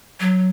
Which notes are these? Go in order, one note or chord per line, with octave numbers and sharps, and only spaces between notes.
F#3